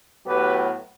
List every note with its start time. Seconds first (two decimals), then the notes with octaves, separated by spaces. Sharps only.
0.25 A2 F#3 B3 G4 B4